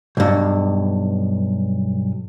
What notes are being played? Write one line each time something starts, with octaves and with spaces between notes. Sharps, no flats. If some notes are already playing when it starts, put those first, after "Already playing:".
B1 G2